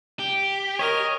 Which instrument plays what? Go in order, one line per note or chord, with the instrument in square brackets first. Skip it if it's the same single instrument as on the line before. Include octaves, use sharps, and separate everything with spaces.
[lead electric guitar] G4
[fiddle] A#4 [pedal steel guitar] C#5 D#5